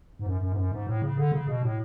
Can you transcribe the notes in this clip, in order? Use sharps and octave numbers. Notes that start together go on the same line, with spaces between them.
G#2
F#2
F#2
G#2
F#2
G#2
A2
C#3
D3
C#3
B2
A2